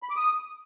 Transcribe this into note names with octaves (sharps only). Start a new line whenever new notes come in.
B5
D6
D#6